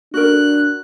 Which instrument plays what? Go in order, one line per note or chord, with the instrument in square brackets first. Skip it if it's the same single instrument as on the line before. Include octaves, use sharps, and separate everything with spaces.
[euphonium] D4 [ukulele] F#4 A#4 [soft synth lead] F#6